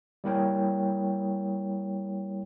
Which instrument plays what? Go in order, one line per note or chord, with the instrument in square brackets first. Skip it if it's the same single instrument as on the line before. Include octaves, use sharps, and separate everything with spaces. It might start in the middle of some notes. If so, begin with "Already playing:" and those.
[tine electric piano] G3 A#3 E4 A#4 C#5 G5